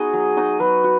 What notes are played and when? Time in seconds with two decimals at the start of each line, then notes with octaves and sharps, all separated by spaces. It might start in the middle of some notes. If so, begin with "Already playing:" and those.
Already playing: B3 D#4 F#4 G#4 D#5
0.13 F#3
0.37 D#4 F#4 D#5
0.60 F#3 B4
0.84 F#4